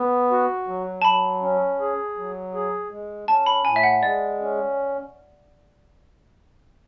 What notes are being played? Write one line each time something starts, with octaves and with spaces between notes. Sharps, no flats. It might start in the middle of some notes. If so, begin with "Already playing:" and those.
Already playing: B3
F#4
F#3
A5
F#3 B5
C#4
G#4
F#3
G#4
G#3
C#4 A5
B5
A2 G#5
E5
F#5
G#3 D5
C#4